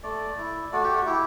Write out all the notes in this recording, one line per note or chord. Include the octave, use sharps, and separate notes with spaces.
A3 D5
E4
A3 F#4
G4
F#4
E4 G4